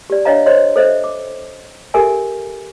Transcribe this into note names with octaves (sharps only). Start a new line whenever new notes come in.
G4 D5
D4 C#5 D#5 F5 A#5
C5 C#5 D#5 C6
A4 C5 D#5 E5
D6
G4 A4 A#4 E5 G#5